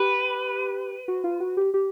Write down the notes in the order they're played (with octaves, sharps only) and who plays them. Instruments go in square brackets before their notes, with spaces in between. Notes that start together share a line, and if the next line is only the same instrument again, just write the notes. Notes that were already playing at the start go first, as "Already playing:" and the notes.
Already playing: [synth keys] G4 [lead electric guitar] B4
[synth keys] F#4
F4
F#4
G4
G4